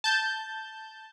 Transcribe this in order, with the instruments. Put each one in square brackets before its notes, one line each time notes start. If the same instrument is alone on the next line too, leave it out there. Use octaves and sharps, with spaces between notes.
[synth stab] A5 G6